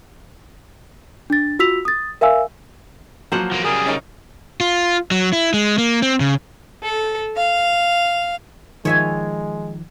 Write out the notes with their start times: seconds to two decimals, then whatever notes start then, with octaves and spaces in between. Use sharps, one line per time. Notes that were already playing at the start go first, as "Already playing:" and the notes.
1.30 D4 A6
1.59 F4 F#4 E6 B6 F7
1.85 D#6 A6
2.21 A#4 E5 F5 G#5 E6
3.32 F3 F#3 A#3 F4 C5 F#5
3.51 E2 F3 A#3
3.64 C#3 G3 G#4 A#4
3.86 C#4 D#4 A#4
4.61 F4
5.11 F#3
5.33 E4
5.54 G#3
5.78 A#3
6.02 C4
6.20 C#3
6.83 A4
7.36 F5
8.85 D#3 F3 G#3 C#5 E5 G#5